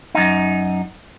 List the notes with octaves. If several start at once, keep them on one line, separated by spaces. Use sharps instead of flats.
F#2 D#4